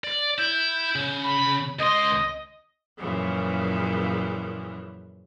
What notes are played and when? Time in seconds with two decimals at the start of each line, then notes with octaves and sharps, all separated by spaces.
0.04 D5
0.38 E4 G6
0.96 C#3
1.24 B5
1.79 C#2 D#5 C6
2.97 F#2 A#2 C#3 E3 F3